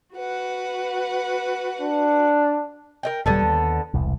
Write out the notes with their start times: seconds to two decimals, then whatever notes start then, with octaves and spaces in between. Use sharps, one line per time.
0.15 F#4 B4 F#5
1.81 D4
3.03 A#4 D#5 G5
3.26 D#1 D3 G3 B3 A4
3.42 D#2
3.94 E1 C2